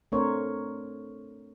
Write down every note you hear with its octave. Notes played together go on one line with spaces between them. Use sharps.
A3 C4 D4 A#4 C5 C#5